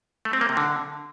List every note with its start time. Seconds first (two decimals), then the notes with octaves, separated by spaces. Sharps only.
0.25 A3
0.33 C4
0.41 A#3
0.49 C3
0.57 D3